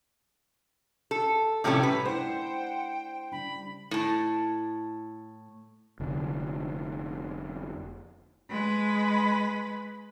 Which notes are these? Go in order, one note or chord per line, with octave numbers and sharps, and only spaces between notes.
A4
A2 C3 F3 G3 C#4 A4
B4
A3 D4 E4 C5 F#5 G5
C#3 G3 D4 B5
A2 A5
F1 D3
G#3 B4